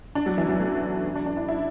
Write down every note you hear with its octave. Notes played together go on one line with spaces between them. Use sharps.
D4
F#3
E3
F#3
A3
D4
D4
E4
E4